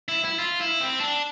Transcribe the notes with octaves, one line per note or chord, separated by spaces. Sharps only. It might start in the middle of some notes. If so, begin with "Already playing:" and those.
E4
E4
F4
E4
C4
D4